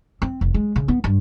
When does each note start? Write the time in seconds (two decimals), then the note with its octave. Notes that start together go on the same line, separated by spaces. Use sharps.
0.22 C4
0.41 F1
0.54 G#3
0.76 C#3
0.88 B3
1.04 G2